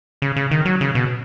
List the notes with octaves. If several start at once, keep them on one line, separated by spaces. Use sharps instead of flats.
C#3
C#3
D#3
F#3
C#3
B2